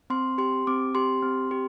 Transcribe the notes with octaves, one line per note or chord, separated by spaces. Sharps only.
C4 C6
G4 C6
C4 D6
G4 C6
C4
G4